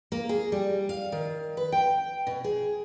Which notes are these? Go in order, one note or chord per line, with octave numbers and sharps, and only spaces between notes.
A#3
G#4
G3
F5
D#3
B4
G5
B2
G#4